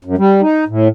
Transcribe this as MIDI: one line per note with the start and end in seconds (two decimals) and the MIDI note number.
0.05 0.15 42
0.18 0.41 55
0.42 0.64 63
0.68 0.88 45